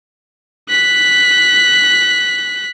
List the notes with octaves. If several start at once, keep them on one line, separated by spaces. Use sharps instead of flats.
F#6 B6